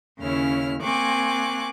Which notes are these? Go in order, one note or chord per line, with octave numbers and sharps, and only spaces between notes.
D#2 C#3 C#4 E4 F6
A#3 C4 G#5 C#6 D6 F#6